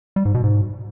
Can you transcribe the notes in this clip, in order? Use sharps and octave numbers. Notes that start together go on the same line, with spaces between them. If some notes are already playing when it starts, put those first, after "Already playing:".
G3
G#2
B2
G#2